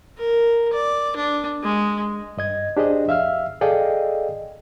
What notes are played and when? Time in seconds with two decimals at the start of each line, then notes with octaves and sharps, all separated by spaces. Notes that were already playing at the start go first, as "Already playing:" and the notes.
0.18 A#4
0.73 D5
1.17 D4
1.64 G#3
2.37 G2 D#5 G#6
2.77 D4 G4 G#4 C5 D5 D#5
3.08 F2 E5 F5 E6 F6
3.61 G#4 A4 D5 D#5 F5 G5